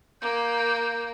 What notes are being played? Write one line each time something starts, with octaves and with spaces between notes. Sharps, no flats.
A#3 G6